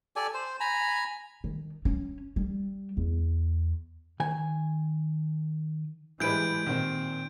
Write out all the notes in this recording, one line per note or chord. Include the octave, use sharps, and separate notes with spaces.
G4 A4 D5 G#5
C5
G#5 A#5 B5
D#3
C#4
G3
E2
D#3 G#5
G#2 E3 G3 G#3 B4 G6 D7
A#2 D#3 C4